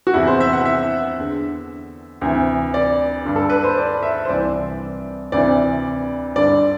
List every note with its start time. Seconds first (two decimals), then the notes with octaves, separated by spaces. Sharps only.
0.07 F#4
0.14 E2 C3 E3 E4
0.27 C5
0.40 E5
0.53 F#5
0.65 E5
1.18 E2 D3
2.21 D2 C3 E3
2.74 D5
3.25 G2 D3
3.36 A4
3.50 B4
3.64 C5
3.77 D5
4.03 E5
4.25 C5
4.29 C2 C3 E3 D5
5.32 D2 C3 E3 D5
6.36 G2 D3 D5